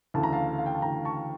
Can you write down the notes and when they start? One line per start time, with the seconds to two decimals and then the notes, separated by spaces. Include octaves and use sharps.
0.14 D2 C#3 E3 A3 A5
0.23 A#5
0.33 F5 A5
0.59 F5
0.66 G5
0.75 A5
0.82 D2 C#3 E3 A3 G5 A#5
1.05 A5 C#6